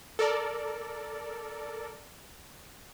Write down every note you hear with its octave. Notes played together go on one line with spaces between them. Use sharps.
A4 A#4 D5